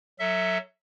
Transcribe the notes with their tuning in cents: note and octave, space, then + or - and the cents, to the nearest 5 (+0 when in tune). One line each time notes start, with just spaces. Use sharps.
F#3 +0 A4 +25 E5 -10